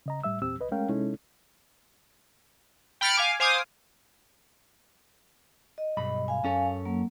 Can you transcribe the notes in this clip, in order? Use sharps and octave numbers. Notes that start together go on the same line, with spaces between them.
C#3 D#5 A#5
A2 G3 E5 E6
E2 A#2 C4 G4 E6
C2 B4 D#5
G#3 A3 C#4 A#4 F5 G5
C3 G#3 C#4 D#4 E4 A4
G5 B5 F6 A6 C#7 D7
F5 G#5 D6 F6
C5 F5 G#5 D6 D#6
D#5
B1 G2 B5
F5 G#5
F#2 C#4 A4
F#3 A#3